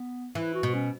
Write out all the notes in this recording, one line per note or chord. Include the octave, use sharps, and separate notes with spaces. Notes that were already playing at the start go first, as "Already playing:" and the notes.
Already playing: B3
E3 E4
F#4
B2
C#4